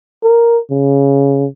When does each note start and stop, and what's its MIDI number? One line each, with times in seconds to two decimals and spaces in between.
0.23 0.58 70
0.71 1.46 49